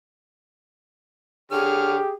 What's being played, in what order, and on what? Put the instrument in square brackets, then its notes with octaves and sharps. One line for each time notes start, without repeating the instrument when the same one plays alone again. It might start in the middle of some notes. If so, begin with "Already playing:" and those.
[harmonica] D3 C#5 F6 [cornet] G4 [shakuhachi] G#4